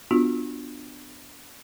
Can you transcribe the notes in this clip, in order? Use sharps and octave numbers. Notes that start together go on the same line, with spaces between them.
B3 D4 F4 F#4